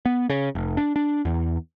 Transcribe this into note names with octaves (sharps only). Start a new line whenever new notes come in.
B3
C#3
F1
D4
D4
E2